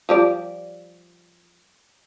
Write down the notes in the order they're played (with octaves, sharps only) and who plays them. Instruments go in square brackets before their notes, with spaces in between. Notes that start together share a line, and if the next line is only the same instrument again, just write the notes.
[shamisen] F3 G3 D5